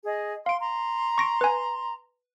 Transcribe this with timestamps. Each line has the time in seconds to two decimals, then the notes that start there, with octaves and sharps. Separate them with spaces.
0.05 G#4 D#5
0.46 F5 C6 D7
0.61 A#5 C6
1.18 C#6 A#6 D7
1.41 B4 G#5